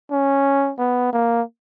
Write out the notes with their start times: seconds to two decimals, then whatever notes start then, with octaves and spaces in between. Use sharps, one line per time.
0.11 C#4
0.79 B3
1.13 A#3